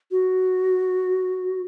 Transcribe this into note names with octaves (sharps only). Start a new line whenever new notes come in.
F#4